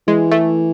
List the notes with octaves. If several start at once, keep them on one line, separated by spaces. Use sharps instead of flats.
E3 G#3
A3